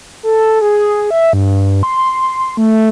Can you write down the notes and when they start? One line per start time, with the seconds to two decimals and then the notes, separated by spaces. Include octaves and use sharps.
0.23 A4
0.61 G#4
1.11 E5
1.33 G2
1.83 C6
2.57 A3